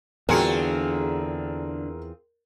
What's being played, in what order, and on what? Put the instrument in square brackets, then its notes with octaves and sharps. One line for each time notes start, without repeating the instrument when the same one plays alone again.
[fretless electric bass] E2 [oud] D3 F#4 [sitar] C4 F4 G#4 [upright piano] A#4 C#7